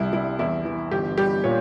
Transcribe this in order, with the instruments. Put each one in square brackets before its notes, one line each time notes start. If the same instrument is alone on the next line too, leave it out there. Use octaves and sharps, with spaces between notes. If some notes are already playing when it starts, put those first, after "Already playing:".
Already playing: [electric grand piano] C2 G3 [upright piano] E4
[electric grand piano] G3 [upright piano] E4
[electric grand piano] E2 [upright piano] E4
[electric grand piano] E3
[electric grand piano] G1 [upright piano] G4
[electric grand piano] G3 [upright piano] G4
[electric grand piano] A#2 [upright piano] C#5